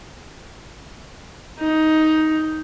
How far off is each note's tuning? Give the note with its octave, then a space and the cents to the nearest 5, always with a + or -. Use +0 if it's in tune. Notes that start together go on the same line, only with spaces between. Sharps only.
D#4 +10